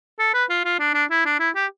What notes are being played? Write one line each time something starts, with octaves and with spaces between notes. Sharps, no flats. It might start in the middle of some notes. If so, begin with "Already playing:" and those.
A4
B4
F4
F4
D4
D4
E4
D4
E4
G4